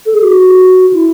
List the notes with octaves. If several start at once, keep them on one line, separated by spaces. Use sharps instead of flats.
A4
G#4
F#4
E4